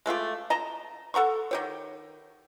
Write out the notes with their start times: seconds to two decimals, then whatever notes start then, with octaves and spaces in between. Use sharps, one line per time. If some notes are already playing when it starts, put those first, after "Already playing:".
0.06 G#3 A3 F4 G4
0.50 D#5 A5 A#5
1.14 A4 F#5 A#5 C#6
1.51 D#3 G4 C#5